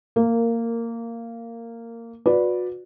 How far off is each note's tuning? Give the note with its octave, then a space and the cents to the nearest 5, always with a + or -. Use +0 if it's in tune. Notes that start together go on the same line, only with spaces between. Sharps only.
A#3 -15 A#4 -5
F#4 -35 B4 +0 D5 +0